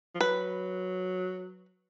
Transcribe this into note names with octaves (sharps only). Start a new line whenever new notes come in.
F3
F#3 B4